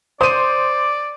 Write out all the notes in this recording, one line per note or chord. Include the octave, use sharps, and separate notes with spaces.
C5 D5 D#6 D#7